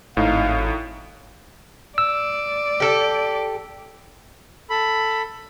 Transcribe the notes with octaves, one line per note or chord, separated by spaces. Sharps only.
G#1 A2 D#4 F5
D5 E6
G4 A4
A4 B5